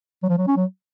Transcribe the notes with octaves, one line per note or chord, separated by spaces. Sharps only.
F#3
F3
F#3
C#4
F#3